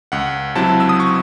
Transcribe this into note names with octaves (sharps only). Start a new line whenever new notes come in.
C#2 F#5
C3 F#3 C4 E4 A5
E6
D#6
C#6